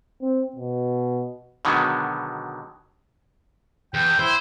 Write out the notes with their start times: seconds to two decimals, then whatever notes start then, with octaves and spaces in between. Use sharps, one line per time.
0.21 C4
0.56 B2
1.65 B2 D3 D#3 F#3 G#3 B3
3.94 E2 G5
4.19 E4 C5